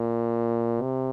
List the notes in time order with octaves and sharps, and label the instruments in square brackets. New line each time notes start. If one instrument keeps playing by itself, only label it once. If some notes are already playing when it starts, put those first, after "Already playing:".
Already playing: [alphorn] A#2
C3